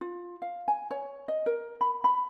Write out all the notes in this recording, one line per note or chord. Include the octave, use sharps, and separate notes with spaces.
F4
F5
G#5
C#5
D#5
A#4
B5
B5